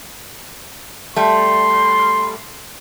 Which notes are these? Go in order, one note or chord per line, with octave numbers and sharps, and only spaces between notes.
G3 A3 C6